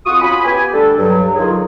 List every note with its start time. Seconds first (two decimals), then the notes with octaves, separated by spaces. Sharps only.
0.06 F2 F4 F#4 F#5 C#6 D#6
0.22 C#4 F4 G#5 B5
0.44 B3 G4 G#5
0.72 D3 G3 A3 D4 A4
0.98 G2 F#3
1.36 D3 D#3 F3 F#3 F4 G#4